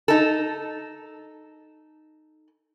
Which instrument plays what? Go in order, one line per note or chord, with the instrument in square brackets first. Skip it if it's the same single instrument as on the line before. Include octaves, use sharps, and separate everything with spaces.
[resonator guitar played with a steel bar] D#4 A4